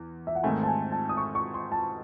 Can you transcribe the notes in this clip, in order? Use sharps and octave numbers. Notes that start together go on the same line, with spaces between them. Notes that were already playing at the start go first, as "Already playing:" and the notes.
Already playing: E2
E5
F#5
G#2 D#3 A3 C4 G#5
A5
G#5
A5
D#6
C#6
C#6
C6
A5